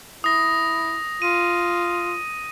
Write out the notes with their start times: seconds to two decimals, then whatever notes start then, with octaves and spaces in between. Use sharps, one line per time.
0.24 E4 D#6 A#6
1.22 F4 D#7